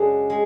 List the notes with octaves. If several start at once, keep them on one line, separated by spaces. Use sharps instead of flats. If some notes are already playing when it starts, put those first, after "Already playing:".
Already playing: F#2 C#3 G#3 D4 F#4
G#3